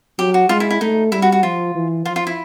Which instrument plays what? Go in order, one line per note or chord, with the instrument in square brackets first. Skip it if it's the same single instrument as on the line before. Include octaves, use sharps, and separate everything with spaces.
[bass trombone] F#3 [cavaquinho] G4
[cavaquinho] F#4
[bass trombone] G#3 [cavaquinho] F4
[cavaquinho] E4
E4
[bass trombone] A3 [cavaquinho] D#4
[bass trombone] G3 [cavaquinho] E4
[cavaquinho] F#4
F#4
[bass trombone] F3 [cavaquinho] F4
[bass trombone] E3
[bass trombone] F3 [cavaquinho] F4
[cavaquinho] F4
E4